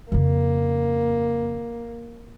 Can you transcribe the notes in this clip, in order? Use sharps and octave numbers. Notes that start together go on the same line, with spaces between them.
F2 C#3 A#3